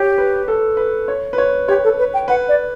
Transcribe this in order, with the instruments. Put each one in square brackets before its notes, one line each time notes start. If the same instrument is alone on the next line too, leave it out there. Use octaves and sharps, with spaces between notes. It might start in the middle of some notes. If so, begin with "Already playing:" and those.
Already playing: [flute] G4 [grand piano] C#5
[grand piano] B4
A4
B4
C#5
B4
C#5
[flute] G4 [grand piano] C#5
[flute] A4
B4
G5
[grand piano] B4 [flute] F#5
[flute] D5